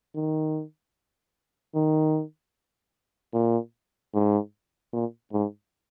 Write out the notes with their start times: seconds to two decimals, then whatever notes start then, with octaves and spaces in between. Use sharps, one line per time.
0.15 D#3
1.75 D#3
3.33 A#2
4.14 G#2
4.93 A#2
5.33 G#2